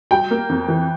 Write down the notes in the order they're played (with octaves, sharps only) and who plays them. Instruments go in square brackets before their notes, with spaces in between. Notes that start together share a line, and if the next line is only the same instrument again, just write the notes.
[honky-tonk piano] G3 [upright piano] G5
[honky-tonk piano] A#3
F2
E3